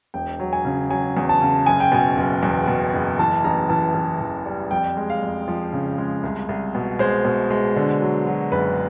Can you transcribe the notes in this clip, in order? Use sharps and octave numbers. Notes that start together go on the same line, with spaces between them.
E1 G5
F#3
G#5
C#3
F#3 G#5
E2
A5
C#3
F#1 G#5
G5
B2 G#5
F#1
E2
B2
F#1
E3 A5
A1 A#5
E3 A5
E3
E3
G3
F2 G5
G#3
F5
F2
F3
C#3
G#3
C2
C2
B2
G#3 C5
B2
G#3
D3
F#3
F#3
F#1 B4